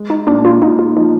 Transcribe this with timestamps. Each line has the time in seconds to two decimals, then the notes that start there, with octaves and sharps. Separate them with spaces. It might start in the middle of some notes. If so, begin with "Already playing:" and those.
Already playing: G#3
0.10 D#4
0.27 A#2 D4
0.45 F4
0.62 A#2 D#4
0.79 F4
0.96 F3 D#4